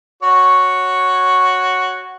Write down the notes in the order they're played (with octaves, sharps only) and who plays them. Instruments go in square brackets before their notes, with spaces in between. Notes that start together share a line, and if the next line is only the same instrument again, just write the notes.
[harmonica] F#4 C#5